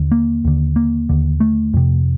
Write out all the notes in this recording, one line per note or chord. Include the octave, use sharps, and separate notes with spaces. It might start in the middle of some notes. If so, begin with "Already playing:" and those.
Already playing: D#2 D3
A#3
D#2 D3
A#3
D#2 D3
A3
F2 C3